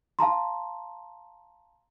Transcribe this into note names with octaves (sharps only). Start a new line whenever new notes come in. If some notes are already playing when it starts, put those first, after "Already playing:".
F5 A5 A#5 C6